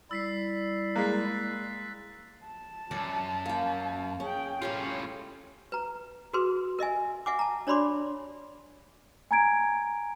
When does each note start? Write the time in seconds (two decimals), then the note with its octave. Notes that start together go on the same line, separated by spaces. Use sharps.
0.11 G3 E4 D5 E6 B6 C7
0.96 G#3 A#3 F#6 A6 B6
2.45 A5
2.91 C#2 F#2 D5
3.46 A#3 G5
4.20 C#4 G#4 G5
4.62 A2 C#4 F4 G4 C#5 G#5
5.72 B4 A#5
6.33 F#4 G#4 A#4 B4 C6
6.79 A#4 D#5 E5 G#5
7.26 E5 F#5 G#5 D6
7.39 A5 A#5
7.67 D4 C#5 D5 B5 C6 D6
9.31 G#5 A#5 G#6 D7